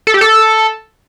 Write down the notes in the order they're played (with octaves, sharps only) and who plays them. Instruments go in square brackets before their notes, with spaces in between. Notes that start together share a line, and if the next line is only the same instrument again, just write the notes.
[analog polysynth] A4
G4
A4